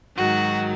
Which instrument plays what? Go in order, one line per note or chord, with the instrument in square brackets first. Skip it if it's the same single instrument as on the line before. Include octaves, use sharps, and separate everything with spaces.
[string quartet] G#2 D#3 F#3 F#4